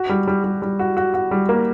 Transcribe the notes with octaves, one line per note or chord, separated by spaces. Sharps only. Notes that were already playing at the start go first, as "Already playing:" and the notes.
Already playing: F#4
G3
G3
G3
G3
F#4
F#4
F#4
G3
A#3